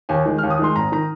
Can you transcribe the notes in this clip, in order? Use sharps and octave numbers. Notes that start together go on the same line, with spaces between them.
D#2 G#5
D#3 G#3
D#2 F6
D#6
D#3 G#3 C6
G#1 A#5
D#3 A#5